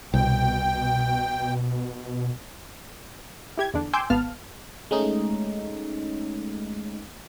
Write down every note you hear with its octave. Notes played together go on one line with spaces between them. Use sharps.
C2 B2 G5
E4 G4 G#6
E2 D3 D4
G5 G#5 C6 D6 E6 G6
G#1 B3 F5 A5 F6
G#3 A3 C#4 D#4